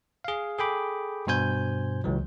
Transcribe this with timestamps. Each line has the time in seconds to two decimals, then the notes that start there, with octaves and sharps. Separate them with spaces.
0.24 G#4 F5
0.58 G#4 A4 G5 B5 D6
1.27 G2 B2 C5 G#5 G6
2.04 C#2 E3 F#3